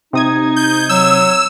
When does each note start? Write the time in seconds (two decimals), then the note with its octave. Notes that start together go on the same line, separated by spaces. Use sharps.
0.13 C3 D#4 D#6 G#6
0.56 G6
0.89 F#3 E6